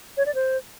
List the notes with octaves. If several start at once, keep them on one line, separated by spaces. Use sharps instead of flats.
C#5
D5
C5